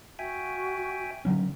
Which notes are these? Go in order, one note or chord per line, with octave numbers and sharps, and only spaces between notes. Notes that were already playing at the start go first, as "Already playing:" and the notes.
F#4 E5 G5 G#5
D3 F#3 C#4